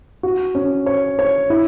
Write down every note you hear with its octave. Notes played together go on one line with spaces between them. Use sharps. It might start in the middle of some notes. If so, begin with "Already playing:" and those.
F#4
C#4
C#5
C#5
E4